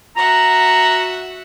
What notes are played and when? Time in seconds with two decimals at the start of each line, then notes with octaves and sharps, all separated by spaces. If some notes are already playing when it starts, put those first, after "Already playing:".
0.17 F#4 E5 F#5 A#5